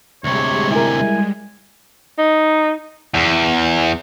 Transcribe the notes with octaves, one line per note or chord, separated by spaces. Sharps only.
D2 C3 G3 G#3 C#5
E4 A#4 G#5
D#4
E2